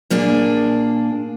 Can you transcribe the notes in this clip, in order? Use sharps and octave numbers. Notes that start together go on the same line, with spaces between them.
A#2 A#3 D4 G#4